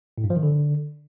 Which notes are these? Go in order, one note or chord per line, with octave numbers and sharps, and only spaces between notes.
A2
G2
F3
D#3
D3